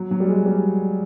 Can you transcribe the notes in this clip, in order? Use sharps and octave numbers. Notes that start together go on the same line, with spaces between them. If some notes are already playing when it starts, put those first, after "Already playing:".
Already playing: F#3
F#3
G3
G#3
G3